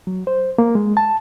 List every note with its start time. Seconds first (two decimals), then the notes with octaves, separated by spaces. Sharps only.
0.07 F#3
0.27 C5
0.58 A#3
0.75 G#3
0.97 A5